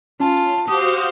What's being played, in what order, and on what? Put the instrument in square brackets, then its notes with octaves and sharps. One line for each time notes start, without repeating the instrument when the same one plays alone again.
[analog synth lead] C#4 [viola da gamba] F4 [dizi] A5
[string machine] F#4 C5 F5 [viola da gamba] G4 [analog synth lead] D#6